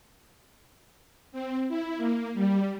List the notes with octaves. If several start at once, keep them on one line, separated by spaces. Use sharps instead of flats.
C4
E4
A#3
G3